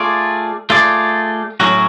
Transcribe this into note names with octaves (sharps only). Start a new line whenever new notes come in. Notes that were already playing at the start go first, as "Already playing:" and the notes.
Already playing: A3 F4 G#4 D5
A3 F4 G#4 D5
A2 F#3 C#4 F#4